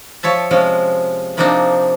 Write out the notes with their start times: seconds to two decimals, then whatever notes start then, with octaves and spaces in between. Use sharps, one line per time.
0.23 F3 C#5 E5 A5
0.51 C3 F3 G#3 C#4
1.37 C3 F3 A#3 C4 D4 D#4